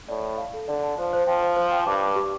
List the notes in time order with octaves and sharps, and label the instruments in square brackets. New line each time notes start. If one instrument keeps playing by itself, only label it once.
[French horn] A2 [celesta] D5
[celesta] A5
F5
A4
[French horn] D3 [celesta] D5
[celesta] A5
[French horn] F3 [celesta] C5
[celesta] C5
[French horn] F3 [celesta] G5
[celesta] C5
C5
G5
[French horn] G2 [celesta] D6
[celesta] D6
G4